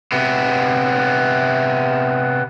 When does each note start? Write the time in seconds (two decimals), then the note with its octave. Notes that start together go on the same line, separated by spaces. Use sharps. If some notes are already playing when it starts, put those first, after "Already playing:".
0.12 C3 B3